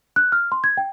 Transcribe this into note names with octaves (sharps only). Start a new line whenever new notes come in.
F#6
F6
C6
G#6
G5